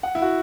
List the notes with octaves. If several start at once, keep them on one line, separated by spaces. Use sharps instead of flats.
F#5
E4
F#4